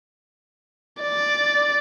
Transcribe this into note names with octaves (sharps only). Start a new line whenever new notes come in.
D5